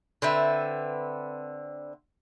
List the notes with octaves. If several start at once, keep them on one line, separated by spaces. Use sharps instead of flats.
D3 C4 B4 E5